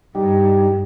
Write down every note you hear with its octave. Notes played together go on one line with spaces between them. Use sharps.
G2 G3 D#4 G4